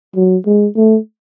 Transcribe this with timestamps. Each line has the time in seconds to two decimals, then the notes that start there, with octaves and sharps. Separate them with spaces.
0.16 F#3
0.46 G#3
0.76 A3